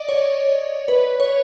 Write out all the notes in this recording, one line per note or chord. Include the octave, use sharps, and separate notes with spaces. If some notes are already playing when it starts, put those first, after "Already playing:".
Already playing: D5 D#5
C#5
B4
C#5